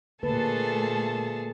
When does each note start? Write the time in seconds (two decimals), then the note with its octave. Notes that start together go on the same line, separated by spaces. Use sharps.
0.23 A#2 D3 A3 A#3 G#4 A4 B4 A5